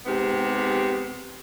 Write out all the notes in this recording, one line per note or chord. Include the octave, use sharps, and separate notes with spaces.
G#2 C3 B3 G4